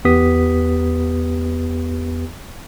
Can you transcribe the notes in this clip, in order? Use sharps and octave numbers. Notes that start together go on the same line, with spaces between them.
E2 B3 G4 B4 D#6 B6